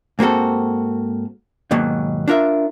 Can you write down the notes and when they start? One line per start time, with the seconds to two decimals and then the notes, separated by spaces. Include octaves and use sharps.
0.19 G#2 A#3 C4 F#4 A4
1.71 D#2 G#2 B2 F#3 A#3
2.28 D4 F4 A#4 E5